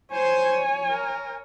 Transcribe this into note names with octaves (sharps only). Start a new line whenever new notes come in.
C5 C#5 G#5
A#4